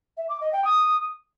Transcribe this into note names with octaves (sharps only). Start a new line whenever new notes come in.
E5
D6
D#5
G5
D#6